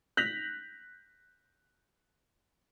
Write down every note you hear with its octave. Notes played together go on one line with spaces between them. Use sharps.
F#6 G6 A#6 B6 F7 F#7